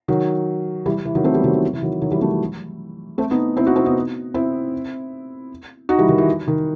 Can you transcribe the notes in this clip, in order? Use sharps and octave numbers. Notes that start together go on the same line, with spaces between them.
D#3 F#3
E3 G3
E3
D#3 F#3
A3 C4
G3 B3
D#3 F#3
E3
E3
D#3 F#3
D#3 F#3
E3 G3
F#3 A3
A3 C4
B3 D#4
C4 E4
D#4 F#4
C4 E4
B3 D#4
C4 E4
D#4 F#4
E3 G3
D#3
E3
D#3